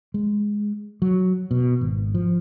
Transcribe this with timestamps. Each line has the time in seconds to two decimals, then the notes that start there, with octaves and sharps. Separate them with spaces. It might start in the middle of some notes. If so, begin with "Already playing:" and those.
0.14 G#3
1.02 F#3
1.51 B2
1.81 G#1
2.14 F3